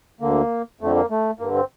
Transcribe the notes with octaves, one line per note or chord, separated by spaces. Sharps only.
D2 D3 A#3
F2 D3 A3
A#3
A3
G2 D3 A#3
C4